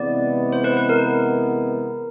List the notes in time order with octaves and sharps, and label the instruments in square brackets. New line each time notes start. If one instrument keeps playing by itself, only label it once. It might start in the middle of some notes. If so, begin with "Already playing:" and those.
Already playing: [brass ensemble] C3 E3 G#3 B3 [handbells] D5
[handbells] C5
B4
B4
A#4